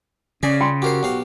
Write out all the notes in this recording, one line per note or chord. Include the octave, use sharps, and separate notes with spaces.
C#3 C#4 D5 G#5
F4 G5 C6
F#4 G4 A#4 C5
B1 G4 F5